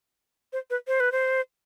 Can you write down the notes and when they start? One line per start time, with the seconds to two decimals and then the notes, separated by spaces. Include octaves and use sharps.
0.53 C5
0.70 B4
0.87 C5
1.00 B4
1.12 C5